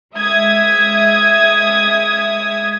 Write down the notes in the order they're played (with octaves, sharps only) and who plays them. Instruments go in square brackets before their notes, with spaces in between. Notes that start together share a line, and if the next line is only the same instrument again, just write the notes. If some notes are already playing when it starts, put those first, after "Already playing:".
[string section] G#3 E5 D#6 G#6